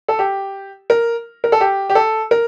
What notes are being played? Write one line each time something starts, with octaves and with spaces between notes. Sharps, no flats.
A4
G4
A#4
A#4
A4
G4
G4
A4
A#4